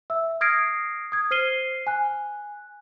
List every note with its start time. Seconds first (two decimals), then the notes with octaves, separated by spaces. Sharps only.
0.10 E5 E6
0.41 D#6 F6 G#6 A#6 C7 D7
1.12 D#6 G#6
1.31 C5 F6 C7 D#7 G7
1.87 G#5 F#6